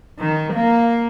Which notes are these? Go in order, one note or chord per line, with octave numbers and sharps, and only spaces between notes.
D#3
A#3